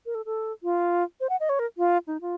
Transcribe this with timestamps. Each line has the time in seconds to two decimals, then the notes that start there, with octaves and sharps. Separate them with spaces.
0.06 A#4
0.15 A4
0.26 A4
0.63 F4
1.20 C5
1.29 F#5
1.40 D#5
1.49 C#5
1.59 A#4
1.78 F4
2.07 D#4
2.21 F4